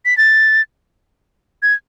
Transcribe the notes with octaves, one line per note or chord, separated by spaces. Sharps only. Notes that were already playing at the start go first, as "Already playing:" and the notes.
B6
A6
G#6